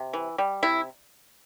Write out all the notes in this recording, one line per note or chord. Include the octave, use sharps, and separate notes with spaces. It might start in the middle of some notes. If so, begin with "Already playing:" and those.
Already playing: C3
E3
G3
C3 E4